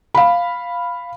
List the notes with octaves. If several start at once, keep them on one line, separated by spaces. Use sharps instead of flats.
F5 B5